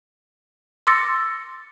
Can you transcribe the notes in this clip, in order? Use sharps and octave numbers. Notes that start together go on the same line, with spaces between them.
C6 D6 E6 A6 A#6 C#7